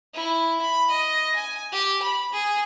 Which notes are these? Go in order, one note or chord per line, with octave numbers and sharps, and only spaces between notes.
E4
B5
D#5
G#5
G4
B5
G#4